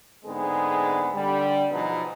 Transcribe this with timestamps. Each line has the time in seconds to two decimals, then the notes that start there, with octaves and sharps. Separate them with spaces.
0.25 G#2 D3 G#3 B3 C4 G#4
1.13 D3 G3
1.70 B2 F3 F#3 B3 D#4 G#4